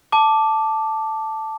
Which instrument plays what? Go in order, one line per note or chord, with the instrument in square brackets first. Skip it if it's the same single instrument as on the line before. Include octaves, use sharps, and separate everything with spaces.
[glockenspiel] A5 D6